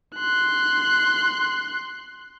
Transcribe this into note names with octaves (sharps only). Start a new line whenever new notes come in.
C6 F#6